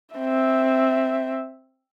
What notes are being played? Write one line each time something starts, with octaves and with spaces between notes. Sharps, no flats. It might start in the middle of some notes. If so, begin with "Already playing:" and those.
C4 E5